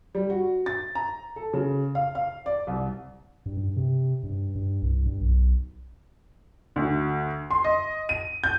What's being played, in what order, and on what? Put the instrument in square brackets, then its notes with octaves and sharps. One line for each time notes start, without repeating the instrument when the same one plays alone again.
[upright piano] G3
F#4
A6
A#5
A4
C#3
F5
F5
D5
C2
[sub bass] G2
G2
C3
G2
G2
C2
G2
B1
[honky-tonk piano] D2
C6
D#5
D#7
G6